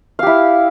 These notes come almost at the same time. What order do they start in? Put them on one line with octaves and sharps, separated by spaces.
F5 G4 E4